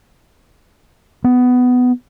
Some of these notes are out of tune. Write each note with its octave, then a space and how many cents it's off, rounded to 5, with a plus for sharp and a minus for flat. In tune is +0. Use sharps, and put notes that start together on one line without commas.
B3 +15